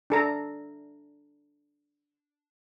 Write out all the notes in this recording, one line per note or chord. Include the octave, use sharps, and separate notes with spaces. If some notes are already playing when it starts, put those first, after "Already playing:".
D4 A4 A#5